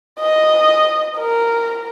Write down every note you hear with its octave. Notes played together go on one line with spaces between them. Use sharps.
D#5
A#4